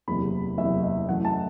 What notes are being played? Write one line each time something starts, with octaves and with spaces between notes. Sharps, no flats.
F#1 E2 C3 B5
F#1 E2 C3 E5
E5
F#2 E3 A3 F#5
A5